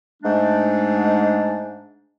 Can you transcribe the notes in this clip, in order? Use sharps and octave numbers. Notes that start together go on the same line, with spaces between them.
G#2 G#3 A3 D4